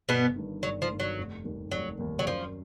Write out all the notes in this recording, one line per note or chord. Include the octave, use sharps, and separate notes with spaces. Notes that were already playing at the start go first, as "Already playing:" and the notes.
G1 B2 B3
G2 D#3
G1 F#3
F3
G2 D#3
F#3
F1
D#2 D#3 G3 A#3
F1 F#3
D#2 D#3 G3 A#3
F#3
F#2 F3